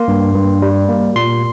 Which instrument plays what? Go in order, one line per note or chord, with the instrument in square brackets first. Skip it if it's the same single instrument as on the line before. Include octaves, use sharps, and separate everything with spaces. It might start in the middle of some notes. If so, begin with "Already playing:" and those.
Already playing: [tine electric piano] A#3 C6
G2
G2
G3
A#3
A#2 C6